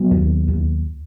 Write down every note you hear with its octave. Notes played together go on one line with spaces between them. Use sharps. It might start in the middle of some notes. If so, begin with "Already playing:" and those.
Already playing: F#3 B3
D#2
D#2